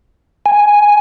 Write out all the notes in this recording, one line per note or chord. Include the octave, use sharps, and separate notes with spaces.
G#5